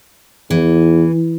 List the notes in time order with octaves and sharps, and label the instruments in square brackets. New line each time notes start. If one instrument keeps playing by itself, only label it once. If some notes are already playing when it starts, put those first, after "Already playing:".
[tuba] E2 [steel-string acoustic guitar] E3